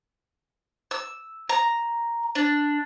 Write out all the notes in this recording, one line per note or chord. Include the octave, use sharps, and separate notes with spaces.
E6
A#5
D4